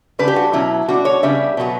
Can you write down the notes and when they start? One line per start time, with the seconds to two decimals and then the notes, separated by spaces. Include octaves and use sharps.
0.19 C#3 G3 D4 B4
0.28 G4
0.36 F#4
0.53 B2 F#3 C#4 E4
0.88 B2 G3 D4 F#4
1.05 C#5
1.23 C#3 G3 B3 D4 E5
1.57 B2 F#3 B3